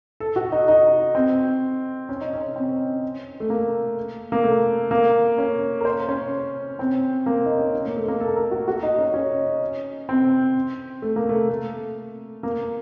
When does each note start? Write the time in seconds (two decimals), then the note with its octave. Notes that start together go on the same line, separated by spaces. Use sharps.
0.20 A4
0.36 F#4
0.52 D#4
0.68 D#4
1.15 C4
2.09 C#4
2.21 D#4
2.33 C#4
2.56 C4
3.40 A3
3.50 A#3
4.32 A#3
4.44 A3
4.91 A#3
5.38 C#4
5.80 A#4
5.85 C5
6.09 C#4
6.79 C4
7.26 A#3
7.46 D#4
7.57 C#4
7.73 D#4
7.85 A#3
7.97 A3
8.08 A#3
8.20 A4
8.36 A#4
8.51 F#4
8.68 F#4
8.83 D#4
8.99 C#4
9.14 C#4
10.09 C4
11.02 A3
11.16 A#3
11.29 A3
11.49 A3
12.43 A#3